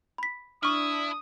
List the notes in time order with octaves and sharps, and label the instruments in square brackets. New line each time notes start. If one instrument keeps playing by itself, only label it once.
[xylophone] B5 B6
[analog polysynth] D4 [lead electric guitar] E4 [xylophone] C#6 F6 [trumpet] D#6